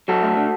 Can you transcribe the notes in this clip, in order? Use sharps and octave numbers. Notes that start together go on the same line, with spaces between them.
F#3 F#4 A4
A3
D3